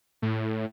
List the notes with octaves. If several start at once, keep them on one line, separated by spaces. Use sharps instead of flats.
A2